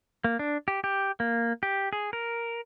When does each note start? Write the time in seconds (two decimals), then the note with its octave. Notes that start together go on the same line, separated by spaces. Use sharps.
0.24 A#3
0.39 D4
0.68 G4
0.84 G4
1.20 A#3
1.63 G4
1.93 G#4
2.13 A#4